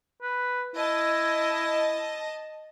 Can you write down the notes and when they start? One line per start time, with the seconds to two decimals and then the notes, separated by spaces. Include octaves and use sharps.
0.22 B4
0.75 E4 D#5 A5